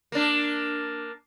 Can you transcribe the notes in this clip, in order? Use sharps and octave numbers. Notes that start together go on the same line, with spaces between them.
A#3 D4